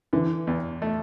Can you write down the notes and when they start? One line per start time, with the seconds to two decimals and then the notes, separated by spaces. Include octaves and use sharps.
0.13 D3 E3
0.47 E2
0.82 A3